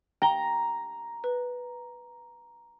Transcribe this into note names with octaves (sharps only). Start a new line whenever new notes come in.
G5 A#5 G7
B4